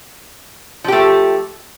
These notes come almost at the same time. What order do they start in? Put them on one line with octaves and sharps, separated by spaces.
F3 G4 A3